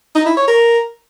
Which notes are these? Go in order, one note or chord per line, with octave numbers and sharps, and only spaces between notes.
D#4
E4
C#5
A#4